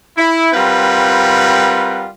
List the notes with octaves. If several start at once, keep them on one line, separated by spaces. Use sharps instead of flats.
E4
G3 C4 F4 A#4 B4 F#5